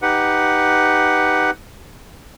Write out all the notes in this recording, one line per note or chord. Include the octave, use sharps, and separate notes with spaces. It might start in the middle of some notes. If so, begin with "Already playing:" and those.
D#4 G4 B4 F#5